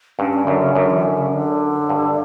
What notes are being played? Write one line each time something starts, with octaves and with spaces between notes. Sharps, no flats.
G2 C#4
C#4
F#2 D3
C#3
F#2 D3
E3
D3
C#3
D3
G2